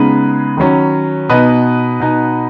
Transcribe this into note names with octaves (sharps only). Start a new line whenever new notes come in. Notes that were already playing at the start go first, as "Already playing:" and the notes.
Already playing: C#3 G#3 B3 D#4 B4
D#3 F#3 C#4
B2 B3 D#4 B4 D#5
B2 B3 D#4